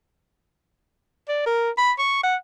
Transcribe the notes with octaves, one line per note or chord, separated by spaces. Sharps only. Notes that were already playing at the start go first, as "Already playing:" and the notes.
D5
A#4
B5
C#6
F#5